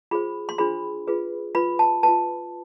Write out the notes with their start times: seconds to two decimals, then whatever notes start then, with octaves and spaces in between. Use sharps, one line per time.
0.11 F4 G#4 C5 B5
0.49 C6
0.58 D4 F4 G#4 C5 B5
1.07 F4 G#4 B4
1.55 F4 B4 B5
1.79 A5
2.03 B4 A5
2.08 F4